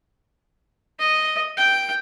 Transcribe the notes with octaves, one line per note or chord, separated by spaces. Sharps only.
D#5
G5